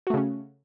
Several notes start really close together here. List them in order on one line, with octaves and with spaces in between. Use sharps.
F#4 A3 C#3 C#4